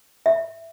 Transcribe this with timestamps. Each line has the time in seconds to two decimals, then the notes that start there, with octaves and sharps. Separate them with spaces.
0.26 E5